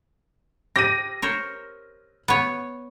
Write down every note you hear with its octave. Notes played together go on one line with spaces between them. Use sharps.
G4 A#6 D#7
A#4 C5 C#5
B3 C#5